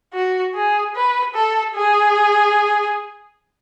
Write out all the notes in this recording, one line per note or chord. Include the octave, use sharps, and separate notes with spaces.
F#4
G#4
B4
A4
G#4